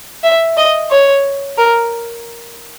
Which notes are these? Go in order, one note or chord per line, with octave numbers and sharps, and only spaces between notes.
E5
D#5
C#5
A#4